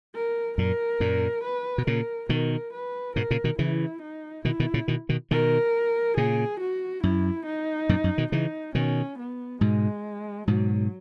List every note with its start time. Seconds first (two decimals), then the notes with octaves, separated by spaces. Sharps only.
0.15 A#4
0.58 F#2 A#2 A#4
1.00 F#2 A#2
1.44 B4
1.78 B2
1.87 A#2 C#3 A#4
2.29 B2 D#3 A#4
2.73 B4
3.16 G#2 B2 A#4
3.31 A#2 C#3
3.44 B2 D#3
3.59 C#3 E3 E4
4.02 D#4
4.45 B2 D#3 E4
4.60 B2 D#3
4.74 A#2 C#3
4.88 B2 D#3
5.09 B2 D#3
5.31 B2 D#3 A#4
6.17 A#2 C#3 G#4
6.60 F#4
7.03 F#2 E4
7.46 D#4
7.89 F#2 A#2
8.04 F#2
8.18 B2 D#3
8.32 C#3 E3 D#4
8.75 B2 D#3 C#4
9.19 B3
9.61 G#2 B2 G#3
10.48 G#2 B2 F#3